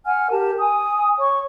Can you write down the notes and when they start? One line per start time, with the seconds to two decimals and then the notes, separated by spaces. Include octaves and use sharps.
0.05 F#5 G#5 F6
0.31 G4 A#4 A5
0.59 G#5 D#6
1.20 C#5 C#6